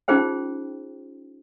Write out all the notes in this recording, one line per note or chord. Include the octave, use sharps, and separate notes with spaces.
C#4 D#4 F4 G#4 C5 G5